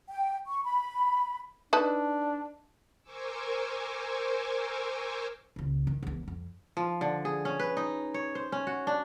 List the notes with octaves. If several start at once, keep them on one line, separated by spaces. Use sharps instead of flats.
G5
C#6
B5
D4 D#4 B4 A5
A#4 C5 G#5 C#6 D6 E6
D#1 C#2
D#3
E1 E2
F2
F3
D3
G#4
C#4
B4
D#4
C#5
C5
C#4
F#4
D4